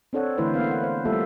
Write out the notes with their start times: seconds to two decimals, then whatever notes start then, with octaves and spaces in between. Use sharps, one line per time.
0.13 C4 D4 A4 C#5 F#5
0.38 D3 E3 A3 E4 B4 C5
0.54 A#3 B3 F5
0.71 F#5
0.83 C5
1.05 G3 A3 A#3 F4 A4 E5